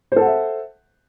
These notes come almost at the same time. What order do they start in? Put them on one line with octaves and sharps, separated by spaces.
C5 A4 F#5 E5